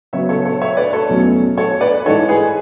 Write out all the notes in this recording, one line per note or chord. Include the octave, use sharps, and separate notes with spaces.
C#3 F#3 B3 C#5 E5
A4 C#5
A4 C#5
C#5 E5
B4 D5
A4 C#5
E2 B2 F#3 A3 C#4
A4 C#5
B4 D5
G#2 E3 G#3 A4 C#5
G#4 B4